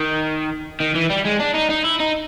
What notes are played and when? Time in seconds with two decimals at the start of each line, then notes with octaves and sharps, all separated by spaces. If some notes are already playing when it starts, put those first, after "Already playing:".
Already playing: D#3
0.80 D#3
0.95 E3
1.10 G3
1.25 G#3
1.40 D4
1.55 D#4
1.71 D#4
1.85 E4
2.00 D#4